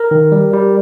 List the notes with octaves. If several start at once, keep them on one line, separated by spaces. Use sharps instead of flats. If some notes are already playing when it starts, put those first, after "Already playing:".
Already playing: A#4
D#3
G3
G3